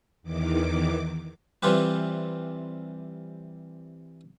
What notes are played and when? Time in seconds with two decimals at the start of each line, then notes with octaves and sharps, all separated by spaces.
0.22 E2 D#3 E3 D6
1.63 C3 E3 G3 F4 G4 B4